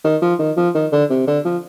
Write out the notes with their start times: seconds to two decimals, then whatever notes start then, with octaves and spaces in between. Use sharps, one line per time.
0.04 D#3
0.22 F3
0.39 D#3
0.57 F3
0.75 D#3
0.92 D3
1.10 C3
1.27 D3
1.45 F3